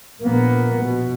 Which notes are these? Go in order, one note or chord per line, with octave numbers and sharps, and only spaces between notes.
A#1 A#3 B3
B2